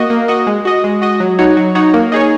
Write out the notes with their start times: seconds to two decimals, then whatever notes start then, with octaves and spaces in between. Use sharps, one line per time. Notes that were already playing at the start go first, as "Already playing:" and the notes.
Already playing: A#3 F#4 D#5
0.10 A#3
0.28 F#4 D#5
0.47 G#3
0.65 F#4 D#5
0.84 G#3
1.02 F#4 D#5
1.20 F#3
1.39 D#4 F#4 C#5
1.57 F#3
1.75 D#4 F#4 C#5
1.93 A#3
2.12 D#4 G#4 C#5